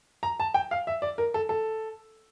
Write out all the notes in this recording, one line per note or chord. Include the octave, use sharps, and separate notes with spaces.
A#5
A5
G5
F5
E5
D5
A#4
A4
A4